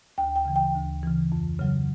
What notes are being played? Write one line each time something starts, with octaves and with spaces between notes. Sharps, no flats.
D2 G5
G5
C#3 E3
G5
D2
C#3 E3
F2
C#3 F#3